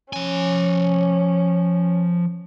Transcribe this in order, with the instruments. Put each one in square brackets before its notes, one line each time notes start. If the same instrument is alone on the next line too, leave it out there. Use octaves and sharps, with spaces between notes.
[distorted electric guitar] F3 G#5 [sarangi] C#4